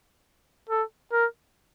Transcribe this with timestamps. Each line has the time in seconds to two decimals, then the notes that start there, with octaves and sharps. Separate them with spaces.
0.70 A4
1.12 A#4